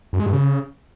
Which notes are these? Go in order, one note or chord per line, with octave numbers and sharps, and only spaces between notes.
F#2
G#3
G2
C#3